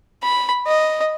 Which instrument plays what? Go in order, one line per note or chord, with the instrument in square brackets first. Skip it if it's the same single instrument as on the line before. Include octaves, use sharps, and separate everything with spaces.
[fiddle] B5
D#5